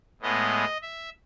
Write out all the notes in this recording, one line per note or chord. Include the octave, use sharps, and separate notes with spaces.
A2 G#3 B3 D#5
E5